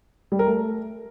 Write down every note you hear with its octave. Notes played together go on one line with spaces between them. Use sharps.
G3
A#4
A3